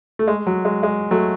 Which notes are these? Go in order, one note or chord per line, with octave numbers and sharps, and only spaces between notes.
A3
G#3
F#3
G#3
G#3
F#3 A3